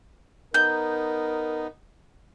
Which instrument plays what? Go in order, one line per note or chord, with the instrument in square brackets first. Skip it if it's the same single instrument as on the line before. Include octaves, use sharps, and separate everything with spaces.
[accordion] B3 D#4 [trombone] A#4 [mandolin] G6